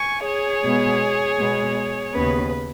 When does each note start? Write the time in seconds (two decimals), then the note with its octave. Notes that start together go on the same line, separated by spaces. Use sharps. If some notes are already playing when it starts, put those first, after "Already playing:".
Already playing: G#5 C#6
0.26 G#4 C#5
0.64 B2 G#3 B3
1.38 B2 G#3 B3
2.13 D#2 C#3 B3 B4